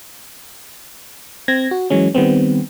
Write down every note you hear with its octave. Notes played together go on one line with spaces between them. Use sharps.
C4 G#6 A#6
F#4
E3 F#3 G#3 C#4
D#3 G3 B3 C4